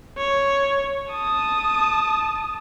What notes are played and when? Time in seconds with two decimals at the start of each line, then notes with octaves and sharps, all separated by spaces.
0.18 C#5
1.12 A5 D#6